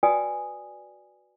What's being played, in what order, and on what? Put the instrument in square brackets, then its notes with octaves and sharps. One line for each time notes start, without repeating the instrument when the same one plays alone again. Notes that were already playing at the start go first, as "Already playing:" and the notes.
[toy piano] F#4 B4 D5 G5 G#5 D#6